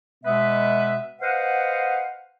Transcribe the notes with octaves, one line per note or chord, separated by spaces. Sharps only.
B2 G#3 B3 B4 E5
B4 C5 D#5 F5 F#5